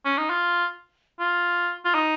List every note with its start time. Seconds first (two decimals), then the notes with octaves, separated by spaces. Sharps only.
0.05 C#4
0.18 D#4
0.30 F4
1.20 F4
1.85 F4
1.94 D#4